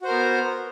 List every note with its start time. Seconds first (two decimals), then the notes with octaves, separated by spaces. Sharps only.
0.01 F#4
0.04 C5
0.08 A#4
0.11 B3